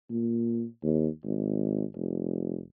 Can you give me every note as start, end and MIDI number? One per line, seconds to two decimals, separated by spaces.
0.10 0.64 46
0.82 1.08 39
1.24 1.84 32
1.95 2.60 29